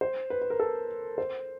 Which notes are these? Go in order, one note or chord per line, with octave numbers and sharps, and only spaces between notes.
C5
B4
B4
A#4
A4
C5